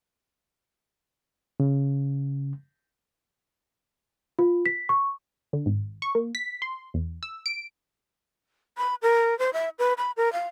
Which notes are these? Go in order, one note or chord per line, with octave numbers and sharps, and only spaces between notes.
C#3
F4
B6
C#6
D3
G#1
C#6
A#3
B6
C6
E2
E6
D7
B5
A#4
C5
E5
B4
B5
A#4
F5